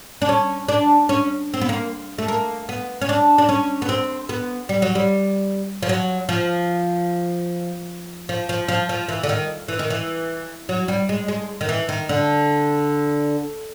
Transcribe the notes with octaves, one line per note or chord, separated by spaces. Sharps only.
D4
C#4
D4
C#4
C4
B3
A#3
A3
A#3
B3
C#4
D4
D4
C#4
B3
C4
B3
G3
F#3
G3
F3
F#3
F3
F3
F3
F3
F3
E3
D3
D#3
E3
D#3
E3
F#3
G3
G#3
G#3
D#3
E3
D#3
D3